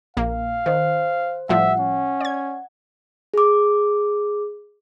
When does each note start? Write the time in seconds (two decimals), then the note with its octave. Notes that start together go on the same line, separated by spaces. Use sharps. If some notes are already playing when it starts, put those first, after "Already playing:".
0.17 A#1 A#3 F5
0.66 D#3 C5
1.49 A2 F3 G3 E5 F#5
1.80 C#4
2.21 D5 G#6
3.34 G#4 D6